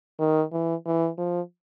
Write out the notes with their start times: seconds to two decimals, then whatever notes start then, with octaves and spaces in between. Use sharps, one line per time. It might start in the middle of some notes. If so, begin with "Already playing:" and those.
0.20 D#3
0.52 E3
0.86 E3
1.18 F3